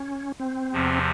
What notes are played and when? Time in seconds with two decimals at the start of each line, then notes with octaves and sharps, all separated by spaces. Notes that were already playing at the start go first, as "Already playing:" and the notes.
Already playing: C#4
0.40 C4
0.73 E2 C3 F3